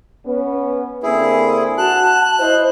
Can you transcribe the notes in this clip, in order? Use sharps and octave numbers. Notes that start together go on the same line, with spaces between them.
B3 C#4
D3 A#3 C4 E4 G#4
F#4 A5 F#6
E4 C5 D#5